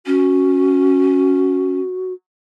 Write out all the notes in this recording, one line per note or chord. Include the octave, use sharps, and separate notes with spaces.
C#4 F#4